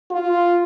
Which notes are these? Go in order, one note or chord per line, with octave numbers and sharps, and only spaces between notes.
F4